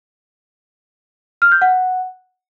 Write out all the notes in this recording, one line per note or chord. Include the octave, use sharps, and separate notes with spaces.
F6
G6
F#5